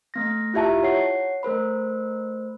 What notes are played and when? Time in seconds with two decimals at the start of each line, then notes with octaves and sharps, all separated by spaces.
0.14 A3 B3 A#6
0.54 E4 F4 G4 E5 A5 A#5
0.83 C#5 F#5 C7
1.43 A3 A#4 C5 B5